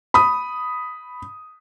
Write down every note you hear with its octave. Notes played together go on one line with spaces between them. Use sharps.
B5 D#6